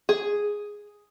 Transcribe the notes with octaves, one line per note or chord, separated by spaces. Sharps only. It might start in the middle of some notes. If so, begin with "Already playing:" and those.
G#4